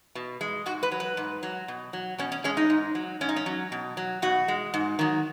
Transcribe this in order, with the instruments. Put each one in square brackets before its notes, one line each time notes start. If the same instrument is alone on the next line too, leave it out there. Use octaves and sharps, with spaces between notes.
[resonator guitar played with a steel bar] B2
G#3
G#2 F#4
B4
F#3
B4
G#2
F#3
B2
F#3
B2 C#4
C#4
G#3 C#4
D#4
G#2
F#3
G#2 C#4
D#4
C#4
F#3
B2
F#3
B2 F#4
G#3
G#2
D#3 F#3